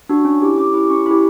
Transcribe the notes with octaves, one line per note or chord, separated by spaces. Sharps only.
D4 F#4
C#4
E4 G4
C#4 D6
E4 G4 D6
C#4 C#6
E4 G4 B5